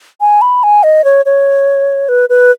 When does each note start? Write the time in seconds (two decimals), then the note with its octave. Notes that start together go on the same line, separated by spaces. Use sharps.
0.21 G#5
0.42 B5
0.63 G#5
0.83 D#5
1.04 C#5
1.26 C#5
2.09 B4
2.29 B4